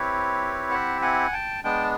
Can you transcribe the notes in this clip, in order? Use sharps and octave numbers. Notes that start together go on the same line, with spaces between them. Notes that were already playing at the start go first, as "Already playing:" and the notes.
Already playing: C4 E4 G4 B4 C#5
E5 F#5
F#5 G#5
G5 A5
G#3 B3 D4 G5 A5